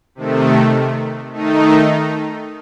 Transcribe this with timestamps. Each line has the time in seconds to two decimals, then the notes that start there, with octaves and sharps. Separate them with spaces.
0.15 C3 D#3 A3
1.34 D#3 A3 D#4